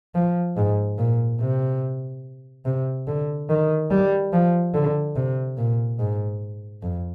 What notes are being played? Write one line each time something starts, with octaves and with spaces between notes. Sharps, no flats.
F3
G#2
A#2
C3
C3
D3
D#3
G3
F3
D3
C3
A#2
G#2
F2